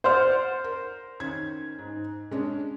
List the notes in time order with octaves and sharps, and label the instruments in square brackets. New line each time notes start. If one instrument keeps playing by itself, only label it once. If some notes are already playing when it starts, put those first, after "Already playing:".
[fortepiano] C5 [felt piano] D5 F#5 F6
[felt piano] A#4
D#3 C#4 G#6
G#2
G#3 C#4 D4